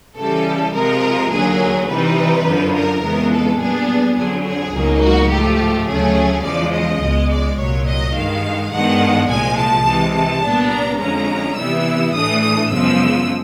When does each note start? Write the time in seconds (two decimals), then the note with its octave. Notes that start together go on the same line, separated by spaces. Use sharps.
0.17 C#3 E3 G3 A4
0.74 C3 F3 G#3 A#4
1.32 D#2 D3 F#3 A#3 G#4
1.89 C3 E3 G3 C4 D#4 B4
2.46 F#2 D3 F3
2.75 A#4
3.02 F2 C#3 E3 G#3 B3
3.31 A4
3.60 A#2 G3 B3 D4 G#4
4.16 F2 D3 F#3 G#4
4.45 G#4
4.74 C#2 B2 F#3 A#3 D#4
5.02 F#4
5.30 G#2 F3 A3 G4
5.87 D2 C#3 F#3 A3 C#4 G#4
6.44 E2 C#3 F3 G#3 D5
6.73 D#5
7.01 C#2 B2 G#3
7.30 D5
7.59 C2 A#2 F#3 C#5
7.87 D#5
8.15 G2 D#3 G#3 F5
8.72 G2 D#3 G#3 B3 D4 F#5
9.29 C2 A#2 F3 G#3 G#5
9.58 A5
9.86 C3 E3 G#3
10.14 A5
10.42 C2 A#2 G3 B3 D4
10.71 A#5
10.99 F2 D3 F3 G#3 C#4 A#5
11.57 C3 E3 G3 B3 E4 E6
12.14 A2 E3 A3 D4 D#6
12.42 D#6
12.71 F#2 C#3 F3 G#3 B3 E6